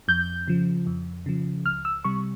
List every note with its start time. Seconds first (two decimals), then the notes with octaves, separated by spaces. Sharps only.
0.08 F2 G6
0.48 C#3 F3
0.87 F2
1.26 C#3 F3
1.65 C#2 F6
1.85 E6
2.04 C3 G3 C#6